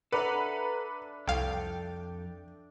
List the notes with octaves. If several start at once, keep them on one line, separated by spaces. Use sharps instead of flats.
D4 A4 B4 E5 F#5 A#5
C2 F2 A4 F5 G5